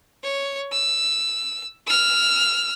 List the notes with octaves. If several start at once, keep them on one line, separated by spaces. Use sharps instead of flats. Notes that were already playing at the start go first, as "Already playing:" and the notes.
C#5
E6
E6 F6